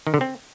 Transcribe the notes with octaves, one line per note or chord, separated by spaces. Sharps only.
D#3
D3
C4